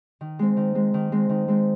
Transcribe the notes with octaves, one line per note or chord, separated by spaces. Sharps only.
D#3
G#3 C4
D#3
G#3 C4
D#3
G#3 C4
D#3
G#3 C4